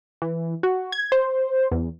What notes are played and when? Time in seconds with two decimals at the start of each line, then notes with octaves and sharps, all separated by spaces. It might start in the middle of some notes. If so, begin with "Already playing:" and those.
0.22 E3
0.63 F#4
0.92 G#6
1.12 C5
1.72 E2